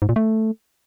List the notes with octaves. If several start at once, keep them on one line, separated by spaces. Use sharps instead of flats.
G#2
A#2
A3